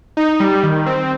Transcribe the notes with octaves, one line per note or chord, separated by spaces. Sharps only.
D#4
G3
D#3
C4